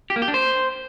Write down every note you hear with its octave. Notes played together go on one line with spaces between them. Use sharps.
G4
A#3
G4
D4
C5